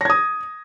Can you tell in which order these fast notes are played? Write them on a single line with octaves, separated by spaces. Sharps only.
A#6 G#6 D#6